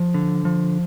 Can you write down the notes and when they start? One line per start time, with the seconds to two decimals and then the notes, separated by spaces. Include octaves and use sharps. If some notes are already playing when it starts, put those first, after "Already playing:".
Already playing: F3
0.14 D3
0.45 F3